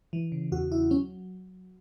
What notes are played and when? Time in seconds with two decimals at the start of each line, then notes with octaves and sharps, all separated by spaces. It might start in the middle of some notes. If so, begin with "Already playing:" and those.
0.13 E3
0.32 C#3
0.52 E2 F#4
0.71 E2 E4
0.91 F#3 C#4